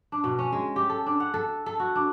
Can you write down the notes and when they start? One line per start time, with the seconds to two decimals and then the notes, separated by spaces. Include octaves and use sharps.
0.12 D4
0.24 B2
0.39 C#4
0.52 G#3
0.76 G4
0.89 A4
1.06 D4
1.20 F#5
1.34 A4
1.66 A4
1.80 F#4
1.96 D4